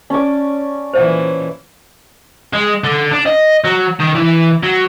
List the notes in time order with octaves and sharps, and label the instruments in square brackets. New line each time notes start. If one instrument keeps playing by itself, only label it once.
[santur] C#4 D6 [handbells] D5 A5 C#6
[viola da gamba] A#2 E3 [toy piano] C5 E5 F#5
[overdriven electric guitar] G#3
D3
D4
D#5
F#3
D#3
E3
F#3